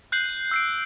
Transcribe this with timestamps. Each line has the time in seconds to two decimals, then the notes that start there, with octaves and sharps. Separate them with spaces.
0.12 F#6 G6 C7 F#7
0.51 E6 C7 D7